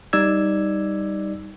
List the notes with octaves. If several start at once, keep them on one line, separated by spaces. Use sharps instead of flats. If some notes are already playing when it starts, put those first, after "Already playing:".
G3 D#4 D5 E6 G#6